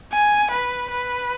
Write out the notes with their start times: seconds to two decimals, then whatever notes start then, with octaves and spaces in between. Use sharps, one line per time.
0.12 G#5
0.51 B4
0.90 B4